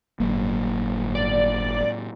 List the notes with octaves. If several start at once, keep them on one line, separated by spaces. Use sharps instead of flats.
G1 A2 F#3 A#3
D5